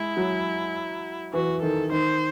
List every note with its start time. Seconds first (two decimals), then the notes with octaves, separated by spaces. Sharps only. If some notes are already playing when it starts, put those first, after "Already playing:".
Already playing: G#3 E4
0.17 F#3
1.34 E3 F#4
1.63 D#3 A4
1.91 D#3 C5